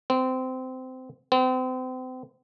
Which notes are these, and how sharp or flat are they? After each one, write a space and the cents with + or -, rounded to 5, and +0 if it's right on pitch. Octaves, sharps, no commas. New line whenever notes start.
C4 -20
C4 -35